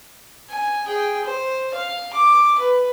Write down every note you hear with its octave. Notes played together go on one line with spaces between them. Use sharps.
G#5
G#4 G5
C5
F5
D6
B4